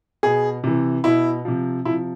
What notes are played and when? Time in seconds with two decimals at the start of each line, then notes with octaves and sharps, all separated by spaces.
0.23 B2 G#4
0.64 C3 E3
1.04 B2 E4
1.45 C3 F3
1.85 C3 F3 E4